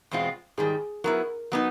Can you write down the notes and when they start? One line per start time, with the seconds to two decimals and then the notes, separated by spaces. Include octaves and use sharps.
0.11 E2 B2 G#3 C4 F4
0.57 G#2 D#3 G3 G#4
1.04 F#3 B3 E4 A#4
1.52 F#3 B3 D#4